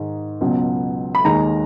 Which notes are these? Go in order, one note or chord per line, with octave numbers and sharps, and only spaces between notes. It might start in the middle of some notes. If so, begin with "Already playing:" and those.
Already playing: G#2 D#3 G#3
C#2 B2 F#3
B5
D#2 D#3 G#3 A#5